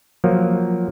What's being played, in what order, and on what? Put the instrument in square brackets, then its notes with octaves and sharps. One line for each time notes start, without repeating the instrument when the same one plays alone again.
[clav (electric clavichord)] F3 F#3 A#3